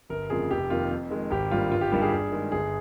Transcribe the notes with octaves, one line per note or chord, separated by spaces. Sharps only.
G1 A#4
F2 C#3 F3 A#3 G#4
F1 G4
F2 D#3 A#3 F4
F2
D#3 G#3
G#1 G4
G2 G3 A#3 F4
G1 F4
G4
G2 D#3 G3 A#3 G4
G#4
G2
D#3 G#3
G1 G#4